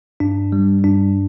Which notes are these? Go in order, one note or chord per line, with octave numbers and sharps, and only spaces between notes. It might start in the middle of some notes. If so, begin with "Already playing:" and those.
G2 D4
G3
G2 D4